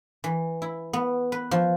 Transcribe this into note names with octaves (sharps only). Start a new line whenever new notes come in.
E3
E4
B3
B4
F3